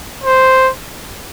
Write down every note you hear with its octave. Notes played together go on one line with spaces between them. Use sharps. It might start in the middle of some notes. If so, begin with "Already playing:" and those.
C5